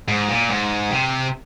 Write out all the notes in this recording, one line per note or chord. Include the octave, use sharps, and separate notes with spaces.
G#2
A#2
G#2
C3